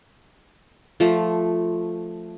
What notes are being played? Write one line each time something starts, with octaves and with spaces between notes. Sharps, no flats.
F3 A3